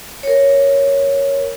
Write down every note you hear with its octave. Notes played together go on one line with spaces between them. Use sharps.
A#4 C#5